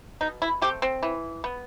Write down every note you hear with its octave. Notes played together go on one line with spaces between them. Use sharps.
B2 D#4
E4
A3 C4 G4
C4
E3
B3